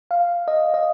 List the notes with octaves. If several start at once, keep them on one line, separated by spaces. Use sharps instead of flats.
F5
D#5
D#5